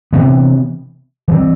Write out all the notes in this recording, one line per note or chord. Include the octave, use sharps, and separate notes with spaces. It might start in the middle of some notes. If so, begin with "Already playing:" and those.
C3 E3 B3
E3 G3 C4